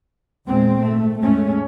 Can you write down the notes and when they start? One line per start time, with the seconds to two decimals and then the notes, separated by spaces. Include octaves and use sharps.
0.45 E2 A#2 G#3 C4
0.82 G#1 A3
1.21 E2 A2 G#3 A3 C#4